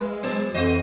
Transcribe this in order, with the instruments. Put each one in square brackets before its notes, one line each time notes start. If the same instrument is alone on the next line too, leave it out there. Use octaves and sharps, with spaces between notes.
[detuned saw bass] G#3 [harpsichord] B4 E5 F5
[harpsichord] B1 E3 A5 [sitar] B3
[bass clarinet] F2 [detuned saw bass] E3 [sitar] F#4 C5 D#5 [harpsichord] F5